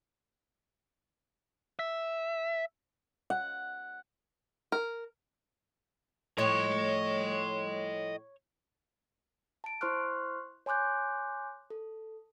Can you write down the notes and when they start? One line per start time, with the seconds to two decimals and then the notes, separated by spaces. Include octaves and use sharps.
1.79 E5
3.30 F#5
4.72 A#4
6.38 A2 F3 C#5 D#5 C6
9.64 A5 D7
9.81 E4 C5 C6 C#6 F6 F#6
10.66 C#5 G#5 C6 D6 F#6 G6
11.70 A4